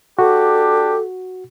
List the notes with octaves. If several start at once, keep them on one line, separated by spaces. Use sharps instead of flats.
D4 F#4 G4 A4